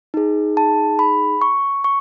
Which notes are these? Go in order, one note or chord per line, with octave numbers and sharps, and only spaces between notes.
D#4 G#4
A5
B5
C#6
C#6